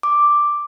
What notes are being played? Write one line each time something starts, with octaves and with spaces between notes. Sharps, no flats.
D6